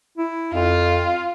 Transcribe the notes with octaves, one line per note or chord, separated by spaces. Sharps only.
E4
F2 F4